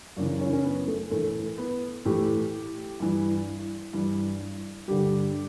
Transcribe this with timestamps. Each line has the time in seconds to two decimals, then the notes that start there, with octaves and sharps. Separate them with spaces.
0.17 F#2 D4
0.20 C#3 E3
0.41 C#4
0.53 C#4
0.64 B3
0.88 A3
1.11 A2 E3 A3
1.58 B3
2.05 A2 E3 G4
3.00 G2 E3
3.93 G2 E3
4.88 G2 D3 G4